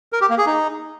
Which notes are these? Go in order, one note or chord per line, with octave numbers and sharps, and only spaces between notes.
A#4
G4
A#3
G#4
D#4